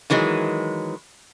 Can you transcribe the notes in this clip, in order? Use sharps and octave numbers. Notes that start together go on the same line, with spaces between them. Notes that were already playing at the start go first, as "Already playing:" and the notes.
D#3 E3 F#3 G#3